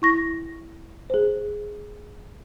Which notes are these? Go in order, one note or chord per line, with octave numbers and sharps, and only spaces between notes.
E4 C#6 A#6
G#4 C5